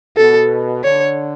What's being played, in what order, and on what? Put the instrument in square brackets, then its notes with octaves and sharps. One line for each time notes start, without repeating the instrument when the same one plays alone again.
[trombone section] B2 [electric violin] A4
[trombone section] D3 [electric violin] C#5